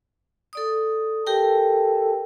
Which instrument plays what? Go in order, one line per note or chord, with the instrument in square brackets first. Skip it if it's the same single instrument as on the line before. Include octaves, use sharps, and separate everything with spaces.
[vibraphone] A4 D5 D#6
[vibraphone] G4 A#4 G5 [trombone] A4